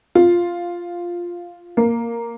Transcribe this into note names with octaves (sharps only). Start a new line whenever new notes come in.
F4
A#3